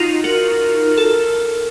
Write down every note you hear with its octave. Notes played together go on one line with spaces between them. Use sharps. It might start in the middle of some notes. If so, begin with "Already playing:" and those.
Already playing: D#4 F4 F#4
F#4 A#4
A4